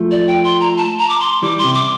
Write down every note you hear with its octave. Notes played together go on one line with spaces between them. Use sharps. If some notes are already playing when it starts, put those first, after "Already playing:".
Already playing: F3 A3
D5
G5
C6
A#5
A5
A#5
D6
C6
E3 G3 D6
C6
C3
D6